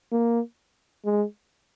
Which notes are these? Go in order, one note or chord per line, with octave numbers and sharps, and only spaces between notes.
A#3
G#3